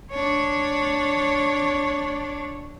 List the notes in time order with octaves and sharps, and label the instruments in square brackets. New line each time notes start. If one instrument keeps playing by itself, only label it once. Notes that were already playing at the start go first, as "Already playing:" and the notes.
[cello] D4 C#5